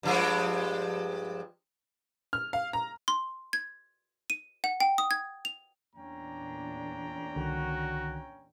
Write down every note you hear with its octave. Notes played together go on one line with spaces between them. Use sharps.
G2 F3 G#3
F6
F5
A#5
C6
G#6
D#7
F#5
G5
D#6
G#6
F7
E2 A#2 C#4 D4 G5 A#5
C2 D3 D#3 F#4